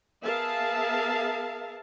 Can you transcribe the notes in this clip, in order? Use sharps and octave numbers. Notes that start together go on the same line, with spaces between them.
B3 G#4 A#4 E5 F5 A5